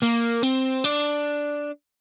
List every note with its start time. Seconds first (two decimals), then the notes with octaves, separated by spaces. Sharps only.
0.03 A#3
0.43 C4
0.85 D4